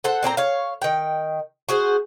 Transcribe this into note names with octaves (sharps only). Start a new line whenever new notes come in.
A4 C5 F#5
A#2 C4 C5 A#5
C#5 F5
D#3 G5
F#4 G#4 C5